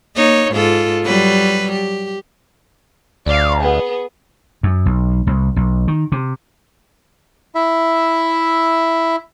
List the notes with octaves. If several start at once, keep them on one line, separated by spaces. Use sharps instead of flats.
A#3 D#4 C#5
G#2 F4 A4
F#3 G3 B4
G4
D2 D5 F5
B3 G#4
F#2
B1
C2
B1
D#3
C3
E4 E5